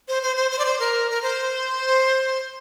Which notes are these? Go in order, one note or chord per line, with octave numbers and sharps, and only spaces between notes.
C5
C5
C5
C5
D5
C5
A#4
A#4
C5